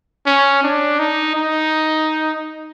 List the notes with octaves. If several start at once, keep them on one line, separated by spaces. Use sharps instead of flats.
C#4
D4
D#4
D#4